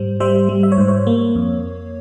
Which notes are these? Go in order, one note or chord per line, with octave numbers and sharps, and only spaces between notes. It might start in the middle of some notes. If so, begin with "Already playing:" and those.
Already playing: G#2 G3 C5
G3 C5 E5
G3
E5
C#5
G#2 C5
C#5
A#3
F2